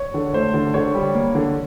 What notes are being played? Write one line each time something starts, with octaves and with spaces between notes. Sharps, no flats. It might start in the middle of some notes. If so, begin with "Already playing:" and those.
Already playing: C#5
D3
A3 C5
D3
D3 C#5
G3
A#3
D3